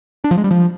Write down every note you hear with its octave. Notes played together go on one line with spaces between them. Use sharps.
D4
F3
G#3
G3
F3